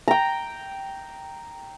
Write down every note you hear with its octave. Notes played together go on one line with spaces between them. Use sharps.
G5 A#5